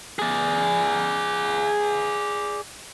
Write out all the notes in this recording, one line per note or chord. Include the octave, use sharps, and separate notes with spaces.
G#4 D5